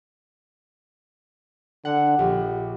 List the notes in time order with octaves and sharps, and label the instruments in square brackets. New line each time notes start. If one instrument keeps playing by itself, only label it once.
[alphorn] D3 [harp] F#5
[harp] A#1 [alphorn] G4